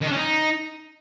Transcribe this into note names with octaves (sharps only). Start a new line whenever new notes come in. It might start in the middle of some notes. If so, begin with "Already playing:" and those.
D#3
D4
C#4
D#4